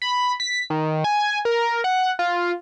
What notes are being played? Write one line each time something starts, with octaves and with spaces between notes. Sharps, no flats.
B5
B6
D#3
G#5
A#4
F#5
F4